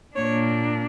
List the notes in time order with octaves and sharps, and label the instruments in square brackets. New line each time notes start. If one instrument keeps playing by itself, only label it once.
[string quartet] A#2 A#3 D4 C#5